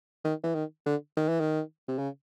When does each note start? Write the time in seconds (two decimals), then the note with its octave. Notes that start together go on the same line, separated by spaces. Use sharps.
0.24 D#3
0.44 E3
0.55 D#3
0.86 D3
1.17 D#3
1.29 E3
1.40 D#3
1.88 C3
1.98 C#3